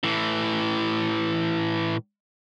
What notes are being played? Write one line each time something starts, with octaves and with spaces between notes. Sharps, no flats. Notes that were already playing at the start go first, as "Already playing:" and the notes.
A2 E3